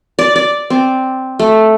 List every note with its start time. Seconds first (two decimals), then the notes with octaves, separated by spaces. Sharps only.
0.19 D5
0.36 D5
0.70 C4
1.39 A3